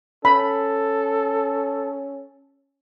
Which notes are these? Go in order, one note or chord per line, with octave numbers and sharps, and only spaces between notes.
C#4 A4 B5